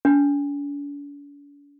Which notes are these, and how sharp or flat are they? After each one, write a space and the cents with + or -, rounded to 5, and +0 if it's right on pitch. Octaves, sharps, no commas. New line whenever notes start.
D4 -45